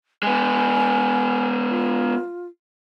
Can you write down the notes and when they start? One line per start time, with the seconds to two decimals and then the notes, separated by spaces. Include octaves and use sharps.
0.23 G#3 B3 G#5
1.70 F4